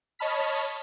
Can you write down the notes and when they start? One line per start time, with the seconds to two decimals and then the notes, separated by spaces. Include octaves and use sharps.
0.19 C#5 D#5 A5 B5 F6 B6